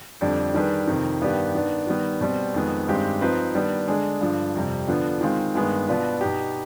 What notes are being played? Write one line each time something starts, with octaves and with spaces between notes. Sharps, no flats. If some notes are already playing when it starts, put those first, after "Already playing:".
F2 D3 G3 D4
D#3 G3 D4 G#4 B4
F2 C3 D#3
G2 D#3 B3 D4 G4
D#3 B3 D4
D#3 G3 B3
B2 G3 C4
F2 D#3 G#3 B3
G2 D#3 G#3 C4 G4
F3 C4 D#4 B4
D#3 G3 B3 D4
D3 G#3 D4 G#4
G2 D3 F3
F2 C3 G3
D3 F3 B3 D4
D#3 G#3 C4 F4
G2 D#3 G#3 B3
B2 B3 D4 F4 B4
B2 B3 D#4 G4